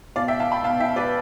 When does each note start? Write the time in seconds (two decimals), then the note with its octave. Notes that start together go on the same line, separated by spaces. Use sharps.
0.16 B2 D5 F5
0.28 E5 G5
0.40 F5 A5
0.52 G5 B5
0.64 B2 F5 A5
0.80 E5 G5
0.96 B4 D5